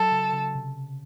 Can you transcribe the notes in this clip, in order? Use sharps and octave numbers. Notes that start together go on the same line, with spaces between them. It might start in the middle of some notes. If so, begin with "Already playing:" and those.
Already playing: F#3 A4
C#3
C#3
C3